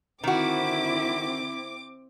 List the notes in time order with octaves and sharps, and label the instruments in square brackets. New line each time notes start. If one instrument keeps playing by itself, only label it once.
[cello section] D3 E4 [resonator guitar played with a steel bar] D#3 F#4 [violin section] C4 D6